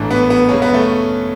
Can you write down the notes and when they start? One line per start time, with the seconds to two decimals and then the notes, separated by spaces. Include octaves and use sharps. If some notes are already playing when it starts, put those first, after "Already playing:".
Already playing: A1 G#2 E3 A3 D4
0.11 B3
0.30 B3
0.49 F#2 C#3 G#3 C#4
0.62 B3
0.74 A3